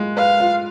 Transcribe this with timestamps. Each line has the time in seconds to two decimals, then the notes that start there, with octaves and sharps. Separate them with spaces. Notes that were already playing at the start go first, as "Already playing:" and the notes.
Already playing: G#3 F4
0.17 B4 F5
0.40 F4